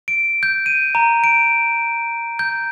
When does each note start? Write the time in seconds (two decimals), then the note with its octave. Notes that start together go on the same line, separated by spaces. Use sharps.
0.08 D7
0.43 G6
0.66 D#7
0.95 A#5
1.24 D7
2.39 G6